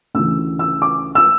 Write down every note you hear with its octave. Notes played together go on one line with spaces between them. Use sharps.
D2 C#3 E3 E6
E6
D6
E6